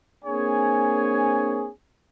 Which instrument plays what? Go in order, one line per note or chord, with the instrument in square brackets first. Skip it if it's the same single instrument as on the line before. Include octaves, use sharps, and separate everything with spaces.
[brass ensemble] A#3 C4 D4 G#4 C#5 G#5